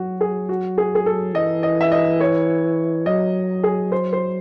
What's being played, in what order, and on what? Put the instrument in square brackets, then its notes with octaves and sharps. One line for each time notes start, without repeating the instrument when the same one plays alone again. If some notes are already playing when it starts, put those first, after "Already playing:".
Already playing: [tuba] F#3 [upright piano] F#4
[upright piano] G#4
F#4
G#4
G#4
A4
[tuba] E3 [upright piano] D#5
[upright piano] D#5
E5
D#5
C#5
[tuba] F#3 [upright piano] D#5
[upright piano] G#4
C5
C5